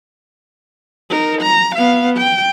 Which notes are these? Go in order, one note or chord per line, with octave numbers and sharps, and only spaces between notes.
D#4 A#4
A#5
B3 F5
G5